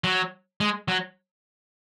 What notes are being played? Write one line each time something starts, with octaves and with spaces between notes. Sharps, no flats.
F#3
G#3
F#3